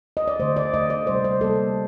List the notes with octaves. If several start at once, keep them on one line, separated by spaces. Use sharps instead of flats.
D#5
D5
D3 A3 C5
D5
D3 A3 D#5
D5
C3 G3 A#3 C5
C5
C3 G3 A#3 A4